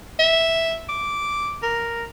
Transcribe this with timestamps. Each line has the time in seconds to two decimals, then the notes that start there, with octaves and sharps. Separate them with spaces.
0.19 E5
0.89 D6
1.63 A#4